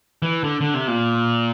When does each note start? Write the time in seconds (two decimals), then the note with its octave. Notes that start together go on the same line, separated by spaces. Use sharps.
0.22 E3
0.44 D3
0.61 D3
0.74 C3
0.87 A#2